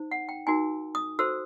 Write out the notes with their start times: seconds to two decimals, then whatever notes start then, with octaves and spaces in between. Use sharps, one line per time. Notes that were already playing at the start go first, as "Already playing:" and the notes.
Already playing: D#4 C5
0.11 F#5
0.29 G5
0.47 D#4 F#4 A#4 G#5
0.95 D#6
1.19 F#4 A4 C5 E6